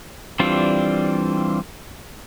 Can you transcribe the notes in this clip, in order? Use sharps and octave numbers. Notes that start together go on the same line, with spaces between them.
E3 G3 C4 D4 F4